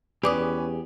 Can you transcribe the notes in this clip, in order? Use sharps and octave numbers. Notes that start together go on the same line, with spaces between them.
E2 C#4 G4 G#4 B4 D5 D6 D#6